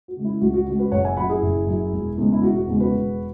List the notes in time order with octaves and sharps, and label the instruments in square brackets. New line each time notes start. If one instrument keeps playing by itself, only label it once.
[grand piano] F#4
C#3 G#3
E4
C#2 F#4
F#4
C#3 G#3 F#4
F#4 B4
F#1 C#5 F#5
E5 G#5
F#2 F#3 F#5 B5
E4 G#4
F#1
F#2 F#3
E1
E2 C#3 G#3
E4
E1 F#4
F#4
E2 C#3 G#3
F#4 B4
E1